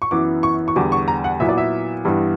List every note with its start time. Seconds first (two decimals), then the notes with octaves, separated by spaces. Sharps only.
0.02 C#6
0.11 F#2 E3 B3 D6
0.43 C#6
0.68 C#6
0.76 E2 D3 G3 B3 D6
0.92 C#6
1.08 A#5
1.24 F#5
1.40 A#2 F#3 B3 E4 E5
1.49 D5
1.58 E5
2.05 G2 E3 G3 B3